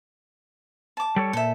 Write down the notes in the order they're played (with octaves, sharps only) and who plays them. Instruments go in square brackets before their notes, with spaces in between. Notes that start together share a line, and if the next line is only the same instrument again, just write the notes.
[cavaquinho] A5 D6
[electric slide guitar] G3 A4 C#5
[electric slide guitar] A#2 [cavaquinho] A4 E5